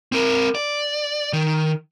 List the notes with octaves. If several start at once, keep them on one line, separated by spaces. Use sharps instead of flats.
C4 A#4
D5
D#3